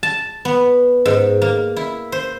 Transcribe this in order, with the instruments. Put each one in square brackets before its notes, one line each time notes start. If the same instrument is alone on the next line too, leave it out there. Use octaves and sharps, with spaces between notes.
[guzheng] A5
B3
G#2
A#3
E4
C5